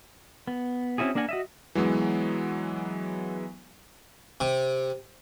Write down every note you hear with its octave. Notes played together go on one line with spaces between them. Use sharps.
B3
C4 C#4 E4 F#4 G#4
A#3 D4 A#4 F#5 G#5
F#4 D#5 E5
E3 F#3 G#3 B3
C3